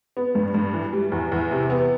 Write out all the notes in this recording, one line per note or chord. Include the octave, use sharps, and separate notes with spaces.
B3
G2
G2
E3
G3
E2
E2
C3
B3